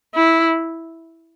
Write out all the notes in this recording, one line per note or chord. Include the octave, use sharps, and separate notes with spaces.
E4